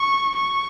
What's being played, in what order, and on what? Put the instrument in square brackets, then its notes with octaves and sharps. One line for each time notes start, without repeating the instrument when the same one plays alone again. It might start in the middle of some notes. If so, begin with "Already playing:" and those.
Already playing: [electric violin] C#6
C#6